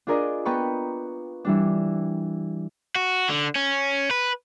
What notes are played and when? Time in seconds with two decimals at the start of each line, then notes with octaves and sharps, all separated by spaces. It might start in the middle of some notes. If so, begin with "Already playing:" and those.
0.07 D4 F4 G#4 A#4 D5 D#5
0.45 B3 B4 G5 A#5 B5 C#6
1.45 E3 G3 D4
2.96 F#4
3.29 D3
3.56 C#4
4.11 B4